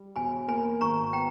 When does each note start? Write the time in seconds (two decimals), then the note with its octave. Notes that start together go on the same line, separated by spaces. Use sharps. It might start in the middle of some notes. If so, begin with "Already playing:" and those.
Already playing: G3
0.15 E1 G#5 B5
0.48 A#3 G#5 B5
0.81 G#1 A#5 C#6
1.13 B3 G5 A#5